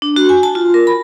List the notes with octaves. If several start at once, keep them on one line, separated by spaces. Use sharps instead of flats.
D4
F#4
G#5
A5
F4
A#4
B5